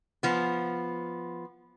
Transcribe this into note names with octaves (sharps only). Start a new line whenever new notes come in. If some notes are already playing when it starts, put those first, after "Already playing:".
F3 B3